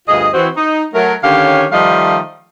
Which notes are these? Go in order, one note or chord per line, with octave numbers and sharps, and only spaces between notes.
D2 G2 F4 G#4 D#5
E3 C4 F#4
D#4
F#3 A3 A#4
D3 D#3 C#4 G4 C#5 F5
D#3 F3 G3 A3 D#5 F5